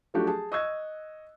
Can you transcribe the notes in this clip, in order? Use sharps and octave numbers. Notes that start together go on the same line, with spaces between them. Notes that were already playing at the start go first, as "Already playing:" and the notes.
F3 F#3 A3 D4 F#4 G4
G#4 A5
D#5 C#6 E6 F#6 G#6